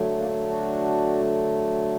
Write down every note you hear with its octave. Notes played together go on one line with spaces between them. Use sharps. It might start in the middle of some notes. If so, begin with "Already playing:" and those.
Already playing: D3 F#3 A3
A#3 D4
D4 F#4